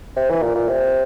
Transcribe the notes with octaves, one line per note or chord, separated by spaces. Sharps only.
C3
E3
A#2
A#2
C3